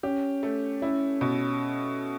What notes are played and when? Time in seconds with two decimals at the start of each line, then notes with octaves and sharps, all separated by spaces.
0.03 C#4 G4
0.43 A3
0.82 C#4 E4
1.21 B2